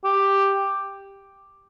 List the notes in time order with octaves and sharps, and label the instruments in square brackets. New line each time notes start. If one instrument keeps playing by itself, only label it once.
[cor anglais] G4